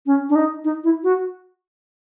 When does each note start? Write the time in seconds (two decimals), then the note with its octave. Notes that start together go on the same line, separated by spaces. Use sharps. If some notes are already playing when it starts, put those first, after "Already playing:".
0.06 C#4
0.30 D4
0.35 D#4
0.64 D#4
0.84 E4
1.04 F#4